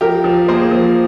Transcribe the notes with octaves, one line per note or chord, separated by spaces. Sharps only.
F3 G4 A#4
F3
A#3 G#4 C5
F3